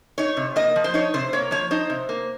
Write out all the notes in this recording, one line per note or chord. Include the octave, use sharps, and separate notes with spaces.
D#4 C#5
C3
A#3 D#5
F3
C5
D#4 C#5
C3 C5
A#3 C#5
F3 C#5
D#4 C5
C3
A#3